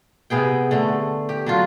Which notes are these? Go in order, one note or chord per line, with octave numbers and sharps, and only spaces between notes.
C3 B3 G#4 G5
D3 A3
G4
F#3 D4 F4